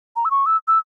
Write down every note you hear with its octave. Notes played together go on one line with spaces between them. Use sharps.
A#5
E6
C#6
E6
E6